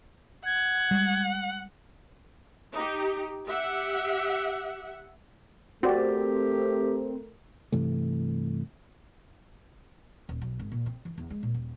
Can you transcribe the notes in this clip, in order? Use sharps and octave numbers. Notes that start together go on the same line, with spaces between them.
F#5 G#6
G3 G#3
D#4 G4
G4 E5 F#5
A3 C4 F#4 G4 A#4 D5
G2 C3 E3 A3
D#1
B1
G#1
A#2
C4
E3
E2
G#3
A#2
D#1